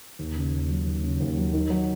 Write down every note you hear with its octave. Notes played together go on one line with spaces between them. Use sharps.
D#2
C#3
D#2
F#3
D#2
C#3
D#2
F#3
D#3
F#3